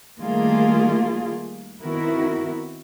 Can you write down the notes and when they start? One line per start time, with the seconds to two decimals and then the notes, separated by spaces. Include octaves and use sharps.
0.20 D#3 G3 A3 A#3 F4 G#4
1.82 D#3 B3 C4 E4 F#4 A#4